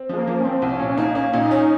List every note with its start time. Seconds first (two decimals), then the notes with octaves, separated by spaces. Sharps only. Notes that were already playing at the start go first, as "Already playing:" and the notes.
Already playing: C4
0.09 F3 G#3
0.18 A#3
0.27 F3
0.40 C#4
0.45 F3 C4
0.62 C2
0.71 C#4
0.80 A#2
0.89 C#4
0.97 A#3 D#4
1.15 A#3 C#4
1.33 A#2 D#4
1.51 C#4